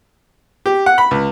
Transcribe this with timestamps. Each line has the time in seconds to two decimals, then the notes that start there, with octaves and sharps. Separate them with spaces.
0.66 G4
0.86 F#5
0.98 B5
1.11 C#2